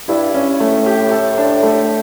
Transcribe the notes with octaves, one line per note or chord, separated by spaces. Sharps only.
G2 E4
C#4
A2 A3
G4
A4
D4
A3